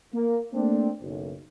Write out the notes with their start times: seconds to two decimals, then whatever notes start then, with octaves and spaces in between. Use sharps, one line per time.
0.14 A#3
0.53 A3 A#3 C4 D4
1.01 F#1 B1